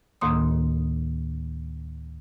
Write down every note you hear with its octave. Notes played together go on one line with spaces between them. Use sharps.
D2 A2 D#3 A#3 C6 D#6